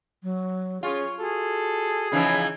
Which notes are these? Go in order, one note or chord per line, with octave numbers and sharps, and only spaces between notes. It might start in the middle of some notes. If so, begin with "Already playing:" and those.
F#3
C#4 F4 G#4 C#5
F#4 G#4 A4
C#3 E3 F3 D#4